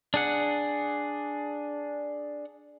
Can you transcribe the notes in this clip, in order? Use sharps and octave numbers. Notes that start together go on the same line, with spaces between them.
D4 G#4 F#5